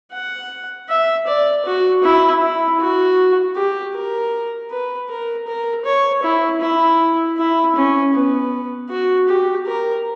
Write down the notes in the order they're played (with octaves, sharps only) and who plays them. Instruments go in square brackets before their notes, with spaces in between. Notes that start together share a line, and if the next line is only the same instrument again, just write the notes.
[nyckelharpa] F#5
E5
D5
F#4
E4
E4
F#4
G4
A#4
B4
A#4
A#4
C#5
E4
E4
E4
C#4
B3
F#4
G4
A#4